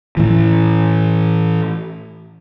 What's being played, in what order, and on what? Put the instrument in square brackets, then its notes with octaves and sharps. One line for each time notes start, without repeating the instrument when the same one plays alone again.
[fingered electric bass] A2 E3